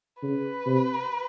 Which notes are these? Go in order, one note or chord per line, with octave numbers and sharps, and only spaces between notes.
C#3 B4
C3